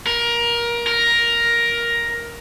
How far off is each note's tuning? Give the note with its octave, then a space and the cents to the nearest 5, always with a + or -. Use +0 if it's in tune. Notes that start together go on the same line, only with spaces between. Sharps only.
A#4 +20
A#4 +10